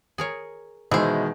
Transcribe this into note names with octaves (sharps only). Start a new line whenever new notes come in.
G#4 A#4 C#5
B2 D#3 E3 G#3 E4 G#4 C5